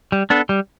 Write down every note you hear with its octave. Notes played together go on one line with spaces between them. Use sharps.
G3
B3 D4 A4
G3